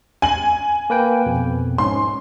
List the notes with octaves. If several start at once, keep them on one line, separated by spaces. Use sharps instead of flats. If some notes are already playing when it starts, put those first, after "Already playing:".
G#5 F#7
A#3 B4 G5
F2 B2
G#2 C#4 C6